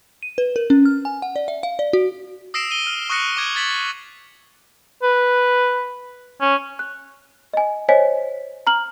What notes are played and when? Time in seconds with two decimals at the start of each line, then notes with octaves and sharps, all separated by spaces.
0.23 D#7
0.38 B4
0.56 A#4
0.70 C#4
0.85 F6
1.05 G#5
1.22 F#5
1.36 D5
1.48 E5
1.63 F5
1.79 D5
1.93 F#4
2.54 D#6 E6 A#6 C7 D7 E7
2.71 D#7 G7
2.87 F6
3.09 C#6 D#6 F#6 A#6 C#7
3.37 D6 G#6 D7
3.55 G#6 A6 B6 F#7
5.03 B4
6.41 C#4
6.79 F#6
7.53 D#5 G#5
7.89 C5 C#5 D#5 G#5 B6
8.67 A#5 F6 F#7